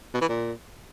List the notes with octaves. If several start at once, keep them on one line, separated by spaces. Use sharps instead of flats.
B2
E3
A#2